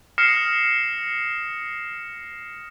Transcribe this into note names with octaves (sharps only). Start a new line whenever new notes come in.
D#6 F6 A#6 C7 C#7 E7